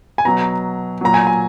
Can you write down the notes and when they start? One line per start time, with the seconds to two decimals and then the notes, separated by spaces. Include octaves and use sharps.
0.18 G#5
0.25 B2 F#3 A#5
1.01 A#2 F#3 A#5
1.14 G#5
1.27 G#5